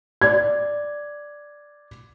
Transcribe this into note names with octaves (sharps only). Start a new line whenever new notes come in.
D5 G#6